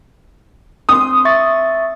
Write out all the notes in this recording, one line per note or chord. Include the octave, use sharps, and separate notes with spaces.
C4 C6 D#6
E5 C#6 A6